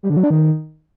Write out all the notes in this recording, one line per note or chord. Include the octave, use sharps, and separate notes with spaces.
G3
D3
F#3
D4
D#3